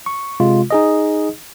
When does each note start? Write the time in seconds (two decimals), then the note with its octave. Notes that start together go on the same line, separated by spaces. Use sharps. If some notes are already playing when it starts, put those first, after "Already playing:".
0.06 C#6
0.40 C3 G#3 F4
0.71 D#4 G#4 D#5